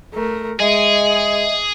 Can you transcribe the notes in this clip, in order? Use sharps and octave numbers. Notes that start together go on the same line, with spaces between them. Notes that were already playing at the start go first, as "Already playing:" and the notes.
A3 A#4
G#3 G#4 D#5 E5